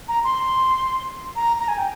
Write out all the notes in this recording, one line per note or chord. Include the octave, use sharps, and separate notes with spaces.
A#5
C6
A#5
A#5
G#5
G5